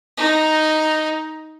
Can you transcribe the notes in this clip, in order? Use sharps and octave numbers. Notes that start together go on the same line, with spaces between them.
D#4